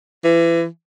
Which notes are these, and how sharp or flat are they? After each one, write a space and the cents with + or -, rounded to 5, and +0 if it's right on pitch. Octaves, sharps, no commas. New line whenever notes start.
E3 +30